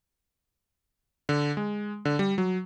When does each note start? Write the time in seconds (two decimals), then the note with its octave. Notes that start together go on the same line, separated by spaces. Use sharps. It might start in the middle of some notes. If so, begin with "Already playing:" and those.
1.29 D3
1.57 G#3
2.05 D3
2.19 G3
2.38 F#3